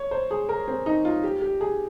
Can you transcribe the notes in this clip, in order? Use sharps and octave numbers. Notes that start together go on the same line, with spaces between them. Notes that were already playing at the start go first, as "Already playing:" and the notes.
Already playing: C#5
C5
G#4
A#4
C4
D#4
F4
G4
G4
G#4